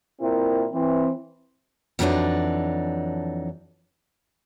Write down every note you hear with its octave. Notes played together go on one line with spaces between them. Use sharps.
A#2 C4 E4 A#4
E3 C4
F2 E3 F#3 A3 D4 D#4